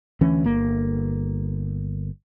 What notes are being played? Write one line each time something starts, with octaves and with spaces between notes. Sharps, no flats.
D2 E3 C#4
G1 A#3